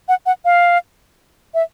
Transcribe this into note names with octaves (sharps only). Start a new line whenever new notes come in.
F#5
F#5
F5
E5